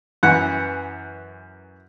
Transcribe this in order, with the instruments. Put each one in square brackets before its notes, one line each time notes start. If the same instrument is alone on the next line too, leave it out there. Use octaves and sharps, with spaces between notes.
[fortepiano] F#2 E3 F#5